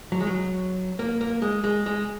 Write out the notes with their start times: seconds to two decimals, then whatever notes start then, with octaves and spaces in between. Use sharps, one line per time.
0.12 F#3
0.20 G#3
0.27 F#3
0.99 A#3
1.21 A#3
1.42 G#3
1.64 G#3
1.86 G#3